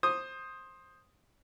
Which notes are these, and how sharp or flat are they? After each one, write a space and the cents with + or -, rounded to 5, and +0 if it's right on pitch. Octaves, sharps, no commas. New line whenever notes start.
C5 +15 D#6 +0